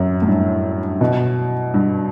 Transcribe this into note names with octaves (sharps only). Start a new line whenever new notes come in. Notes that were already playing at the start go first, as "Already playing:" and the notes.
Already playing: F#2
A2
G2
B2
G2